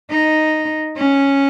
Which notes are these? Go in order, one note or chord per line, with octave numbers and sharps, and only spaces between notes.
D#4
C#4